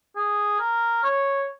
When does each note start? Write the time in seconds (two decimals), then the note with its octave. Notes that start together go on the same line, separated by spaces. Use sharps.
0.16 G#4
0.60 A#4
1.04 C#5